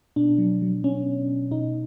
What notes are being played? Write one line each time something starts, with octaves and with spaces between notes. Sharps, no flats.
B2 D4
F#3
F#3
B2 C#4
B2
B2
B2 D#4